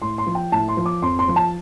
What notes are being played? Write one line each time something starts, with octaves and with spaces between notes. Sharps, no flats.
A2 C6
C6
F3
G5
A2 A5
C6
F3
D6
F2 C6
C6
F3
A5